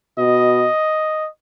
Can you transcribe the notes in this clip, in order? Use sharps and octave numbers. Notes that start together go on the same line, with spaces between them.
B2 D#5